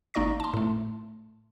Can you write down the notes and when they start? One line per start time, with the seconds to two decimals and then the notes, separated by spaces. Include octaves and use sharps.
0.14 G#1 A#3 D#4 D5 C#6 A#6
0.40 A5 C6
0.54 A2 A3